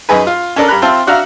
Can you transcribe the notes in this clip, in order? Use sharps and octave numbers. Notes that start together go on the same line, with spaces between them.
F#2 D#4 G#4 B4
F4
C#4 D4 A4 A#4 D5
G2 A#5 B5 F#6
C4 F4 C5 E5 A5 C6
D4 F#4 E5 F5 A#5